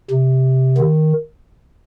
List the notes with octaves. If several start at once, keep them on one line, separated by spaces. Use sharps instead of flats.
C3
D#3